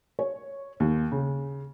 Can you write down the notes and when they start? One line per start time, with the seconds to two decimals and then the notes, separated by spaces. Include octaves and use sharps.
0.19 C#5
0.80 D#2
1.12 C#3